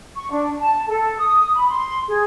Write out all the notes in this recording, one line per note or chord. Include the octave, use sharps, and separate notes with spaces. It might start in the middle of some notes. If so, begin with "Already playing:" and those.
C#6
D4
A5
A4
D#6
B5
C6
G#4